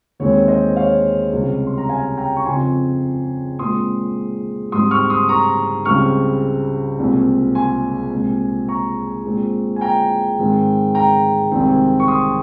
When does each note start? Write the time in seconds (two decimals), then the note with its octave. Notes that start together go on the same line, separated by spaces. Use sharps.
0.19 D#2 D#3 G#3 C4 C#5
0.48 C5 D#5
0.76 C#5 F5
1.33 C#2 C3 G3
1.67 C6
1.78 A#5
1.89 F5 G#5
2.17 G5 A#5
2.36 C#6
2.46 F2 C#3 F3 C4 G#5 C6
3.59 A#2 G#3 C4 C6 D#6
4.72 G#2 G3 C4 C6 D#6
4.91 C#6 F6
5.10 C6 D#6
5.29 A#5 C#6
5.85 C#2 C#3 G3 C4 C#6 F6
6.99 C2 A#2 G#3 C4
7.55 G#5 C6
8.12 C2 A#2 G#3 C4
8.68 A#5 C#6
9.25 A#2 G#3 C4
9.76 G#5
9.81 G5 A#5
10.38 G#2 D#3 G#3 C4
10.95 G5 A#5
11.51 C2 C3 D#3 G#3 C4
12.00 C#6
12.08 C6 D#6